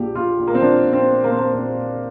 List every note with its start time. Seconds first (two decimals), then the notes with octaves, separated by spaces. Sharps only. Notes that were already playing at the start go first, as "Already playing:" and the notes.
Already playing: A#1 A#2 G4
0.15 A#1 F4
0.39 A#1
0.47 A#3
0.54 C4
0.62 F3 D4
0.85 A#1
0.93 C4
1.09 A#2
1.24 A#3
1.31 A#2 C4
1.39 A#3
1.54 A#1 C4
1.78 A#2